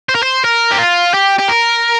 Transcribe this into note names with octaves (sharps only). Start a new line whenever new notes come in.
C5
A#4
C5
A#4
G4
F4
G4
G4
A#4